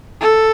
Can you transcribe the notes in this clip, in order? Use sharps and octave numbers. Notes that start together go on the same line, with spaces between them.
A4